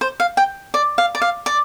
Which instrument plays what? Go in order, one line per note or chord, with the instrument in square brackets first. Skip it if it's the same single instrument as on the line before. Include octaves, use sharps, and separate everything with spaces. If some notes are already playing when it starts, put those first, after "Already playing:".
[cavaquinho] C5
F5
G5
D5
F5
D5
F5
D5